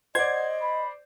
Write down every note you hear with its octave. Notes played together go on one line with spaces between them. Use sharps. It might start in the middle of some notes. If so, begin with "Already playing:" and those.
C5 D5 D#5 F#5 G#6
B5